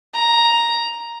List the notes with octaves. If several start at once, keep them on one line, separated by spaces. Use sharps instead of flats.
A#5